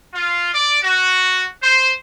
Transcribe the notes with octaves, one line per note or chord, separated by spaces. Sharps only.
F4
D5
F#4
C5